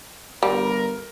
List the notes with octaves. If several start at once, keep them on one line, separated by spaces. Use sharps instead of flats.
G1 G3 A#4